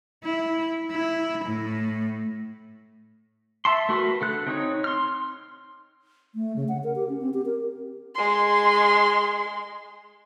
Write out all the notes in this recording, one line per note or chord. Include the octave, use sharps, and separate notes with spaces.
E4
E4
A2
E5 A5 C6
A3 F#4 A#4 B4
D3 A4 F#6
C4 D#4 C#5
C6 F6
A3
C#3
F#5
A#4
G4
C#4
C4
G4
A#4
G#3 C6